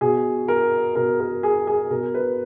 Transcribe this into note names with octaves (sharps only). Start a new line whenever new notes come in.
B2 G#4
A#4
B2 A#4
A#4
G#4
G#4
B2 A#4
B4